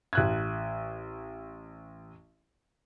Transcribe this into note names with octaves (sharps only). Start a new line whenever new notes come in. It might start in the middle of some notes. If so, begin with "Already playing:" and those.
A1 F#6 G#6